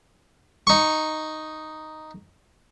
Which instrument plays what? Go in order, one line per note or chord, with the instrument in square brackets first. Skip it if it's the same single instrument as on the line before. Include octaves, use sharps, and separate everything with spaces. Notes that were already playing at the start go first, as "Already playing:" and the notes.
[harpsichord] D#4 C#6